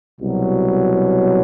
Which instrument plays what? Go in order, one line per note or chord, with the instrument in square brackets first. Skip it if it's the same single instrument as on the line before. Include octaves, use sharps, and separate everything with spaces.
[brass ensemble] C2 B2 F#3